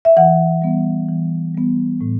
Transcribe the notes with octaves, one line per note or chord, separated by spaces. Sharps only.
E5
E3 F#5
G3 B3
E3
G3 B3
A2